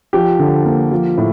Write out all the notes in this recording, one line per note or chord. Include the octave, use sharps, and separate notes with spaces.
F3 G4
D3
A#3
F3
A2